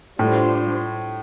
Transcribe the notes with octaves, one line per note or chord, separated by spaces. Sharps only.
A2 G3 D4 F4 C5